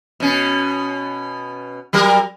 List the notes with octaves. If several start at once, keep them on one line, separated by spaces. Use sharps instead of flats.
B2 C#4
F#3 G3 A#4